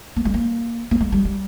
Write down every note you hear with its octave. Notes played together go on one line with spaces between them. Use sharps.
A#3
G#3
A#3
A#3
G#3
G3
G3